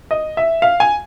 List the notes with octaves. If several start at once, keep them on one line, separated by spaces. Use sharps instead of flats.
D#5
E5
F5
G#5